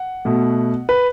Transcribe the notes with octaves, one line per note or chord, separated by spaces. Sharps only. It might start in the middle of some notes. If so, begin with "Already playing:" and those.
Already playing: F#5
B2 A3
B4